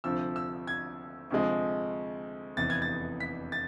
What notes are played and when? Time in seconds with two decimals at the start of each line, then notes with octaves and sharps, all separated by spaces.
0.04 D2 C3 F3 E6
0.36 E6
0.67 G#6
1.30 D2 C3 F3 G#3
2.57 F1 E2 C3 E3 A6
2.70 G#6
2.82 A6
3.20 B6
3.52 A6